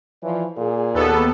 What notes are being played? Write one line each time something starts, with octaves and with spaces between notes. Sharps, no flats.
E3 F3 C#5 D5
A#2 G#4
D#2 B3 A4